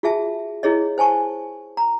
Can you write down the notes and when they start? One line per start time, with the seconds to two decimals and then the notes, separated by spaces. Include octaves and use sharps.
0.03 F4 F#4 G#4 E5 A5
0.63 E4 G#4 C#5 D#5
0.98 C5 G#5 A5 C#6
1.77 A#5